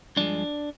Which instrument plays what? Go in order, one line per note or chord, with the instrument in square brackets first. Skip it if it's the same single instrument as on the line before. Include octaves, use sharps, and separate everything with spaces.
[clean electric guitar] G2 F3 G#3 D4